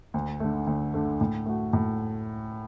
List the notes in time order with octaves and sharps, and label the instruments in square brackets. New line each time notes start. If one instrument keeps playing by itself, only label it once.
[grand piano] D2
D3 A3
D2
D3 A3
A2
A3 F#4
A2